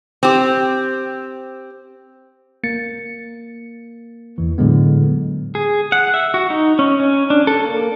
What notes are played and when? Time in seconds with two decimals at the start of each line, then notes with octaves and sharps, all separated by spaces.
0.23 C4 G4
2.64 A#3 A6 C#7
4.38 E2 E3
4.58 A2 D3 F#3 G#3 B3
5.55 G#4
5.92 F#5
6.14 E5
6.34 F#4
6.50 D#4
6.79 C#4
7.00 C#4
7.30 D4
7.47 A4
7.65 A#3